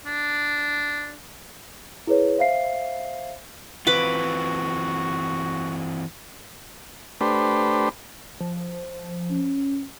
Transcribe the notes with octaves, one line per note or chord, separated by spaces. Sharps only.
D4
E4 G#4 B4 C#5
C5 E5 F5 C7
E3 C4 F4 F#4 B4 B5 D6
A3 D4 G4 B4 C5
F3
C#4